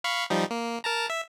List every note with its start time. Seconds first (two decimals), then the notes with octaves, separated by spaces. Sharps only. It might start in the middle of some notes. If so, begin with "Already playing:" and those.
0.04 F5 B5 C#6
0.30 F3 G3 D#4
0.51 A#3
0.84 A#4 A5 A#5
1.10 E5